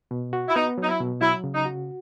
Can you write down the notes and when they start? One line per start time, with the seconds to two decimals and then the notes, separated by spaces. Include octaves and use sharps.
0.11 B2
0.33 F#4
0.48 E4
0.55 B3 D#4
0.78 F#3
0.83 D#4
0.88 E4
1.00 B2
1.21 F#3 E4
1.44 C#3
1.55 D#4
1.65 F#4